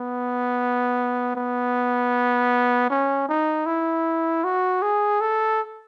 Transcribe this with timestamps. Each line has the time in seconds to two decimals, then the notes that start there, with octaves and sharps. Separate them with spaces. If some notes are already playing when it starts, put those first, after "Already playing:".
Already playing: B3
1.36 B3
2.90 C#4
3.29 D#4
3.66 E4
4.44 F#4
4.82 G#4
5.21 A4